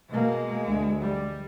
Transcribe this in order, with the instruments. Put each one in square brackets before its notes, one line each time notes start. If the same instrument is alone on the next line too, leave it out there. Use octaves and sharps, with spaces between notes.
[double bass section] B2 A#3 [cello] G#3
[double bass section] D2
G3